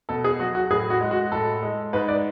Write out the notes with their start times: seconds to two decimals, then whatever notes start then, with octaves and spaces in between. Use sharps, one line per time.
0.09 B2 A4
0.24 G#4
0.40 F#3 F#4
0.55 F#4
0.70 A2 G#4
0.90 F#4
1.01 G#3
1.11 F#4
1.32 A2 A4
1.62 G#3
1.93 G#2 B4
2.08 D5